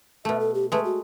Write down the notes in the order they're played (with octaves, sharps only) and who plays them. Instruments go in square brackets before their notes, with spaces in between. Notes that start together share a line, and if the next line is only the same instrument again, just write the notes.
[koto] B2 A3 [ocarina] E5
[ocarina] A4
G4
[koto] G#3 A3 [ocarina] B4
[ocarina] F#4